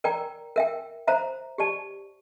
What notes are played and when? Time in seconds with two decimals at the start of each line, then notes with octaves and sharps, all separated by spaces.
0.04 A#4 D5 G5 A#5
0.56 A#4 E5 G5
1.08 C5 E5 A#5
1.58 G4 D5 A5